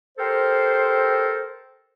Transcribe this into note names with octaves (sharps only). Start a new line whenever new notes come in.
G4 A4 A#4 C5